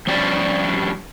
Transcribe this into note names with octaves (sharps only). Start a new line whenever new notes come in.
F3 G3 C#4 D4 G4 D5